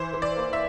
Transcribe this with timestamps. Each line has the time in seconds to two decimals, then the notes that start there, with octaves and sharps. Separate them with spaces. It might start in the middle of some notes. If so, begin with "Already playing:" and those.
Already playing: E3 C5
0.13 E3
0.22 D5
0.37 A#3
0.53 E5